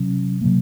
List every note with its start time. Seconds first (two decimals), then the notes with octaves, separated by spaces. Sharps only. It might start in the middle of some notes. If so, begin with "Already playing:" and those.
Already playing: C3 F#3 C#4
0.41 C3 F#3 A#3